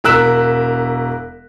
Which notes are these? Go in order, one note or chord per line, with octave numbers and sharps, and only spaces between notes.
E1 A#4 E6 F#6 B6 E7